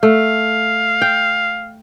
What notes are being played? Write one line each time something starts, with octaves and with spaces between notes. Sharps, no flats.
A3 F5
G5